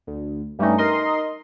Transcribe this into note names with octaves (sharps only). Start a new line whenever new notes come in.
D2
G2 G3 A3 C#4 D#4
D#4 A#4 D#5 C6